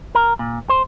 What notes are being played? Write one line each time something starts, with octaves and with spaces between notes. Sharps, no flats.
A#4
A#2
C5